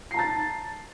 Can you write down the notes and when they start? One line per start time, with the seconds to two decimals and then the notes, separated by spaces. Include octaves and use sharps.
0.11 C7
0.14 A#5
0.16 A5
0.19 A6